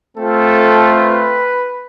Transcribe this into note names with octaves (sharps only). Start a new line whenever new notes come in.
A3 C4 F4 A4
B4